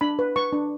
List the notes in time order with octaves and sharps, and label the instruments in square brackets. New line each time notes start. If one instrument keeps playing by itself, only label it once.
[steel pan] D4 B5
B4
B4 C#6
D4